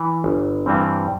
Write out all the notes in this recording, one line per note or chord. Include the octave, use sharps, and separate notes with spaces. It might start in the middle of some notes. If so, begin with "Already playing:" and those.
Already playing: E3
G1
G2 E3 G3 C4